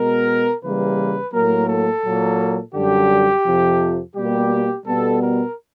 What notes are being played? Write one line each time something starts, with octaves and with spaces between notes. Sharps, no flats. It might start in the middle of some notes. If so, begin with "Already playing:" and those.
Already playing: B2 G#3 B3 A#4
C#3 E3 G3 A#3 B4
A2 F#3 A#3 A#4
A4
A#2 F#3 A#3
F#2 D3 G3 G4
F2 C3 F3
B2 G3 A#3 G4
B2 G3 B3 A4
A#4